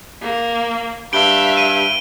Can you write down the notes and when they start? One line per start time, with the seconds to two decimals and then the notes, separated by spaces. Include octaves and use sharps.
0.22 A#3
1.13 G2 E5 F5 D7 G7
1.57 D#7